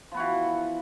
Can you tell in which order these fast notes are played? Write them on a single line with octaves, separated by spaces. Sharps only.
F3 B3 F#4 E3